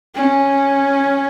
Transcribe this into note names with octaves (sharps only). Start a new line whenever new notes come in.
C#4